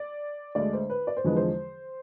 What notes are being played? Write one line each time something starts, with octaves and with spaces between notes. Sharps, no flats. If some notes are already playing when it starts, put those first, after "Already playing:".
Already playing: D5
D2 D3 G#3 D5
C5
B4
D5
C5
E2 D3 F3 G#3 B4
C5